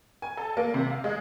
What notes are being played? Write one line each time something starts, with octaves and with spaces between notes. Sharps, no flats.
G#5
A4
A#3
C3
F5
G#3